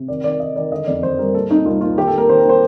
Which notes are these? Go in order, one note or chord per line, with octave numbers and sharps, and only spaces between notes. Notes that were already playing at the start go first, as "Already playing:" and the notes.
Already playing: C3
D#3 D5
D#3 D5
D#3 D#5
D#3 D5
D3 D#5
F2 D5
F2 C5
G3 A#4
A#2 A4
C4 D#4
C2 F4
A#2 F4
D#3 G4
A4
A#3 A#4
D#3 C5
A#3 A#4
C5